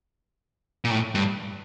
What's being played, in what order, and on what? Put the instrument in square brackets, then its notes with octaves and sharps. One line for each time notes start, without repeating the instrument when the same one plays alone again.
[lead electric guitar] A#2
A2
G2